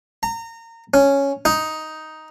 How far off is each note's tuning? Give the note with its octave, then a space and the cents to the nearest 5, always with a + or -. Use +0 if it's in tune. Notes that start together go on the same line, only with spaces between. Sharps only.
A#5 -25
C#4 +0
D#4 +5